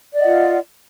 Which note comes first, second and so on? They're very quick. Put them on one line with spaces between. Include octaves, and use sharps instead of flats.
D5 D#5 F#5 F4